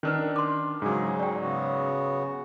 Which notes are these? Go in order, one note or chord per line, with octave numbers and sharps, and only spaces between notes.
D#3 C#4 D4 A#4 B4
C6 D6
G#2 C#3 F#3 C#4 G#4
F#4 D5 G5
C#3 B3 F#4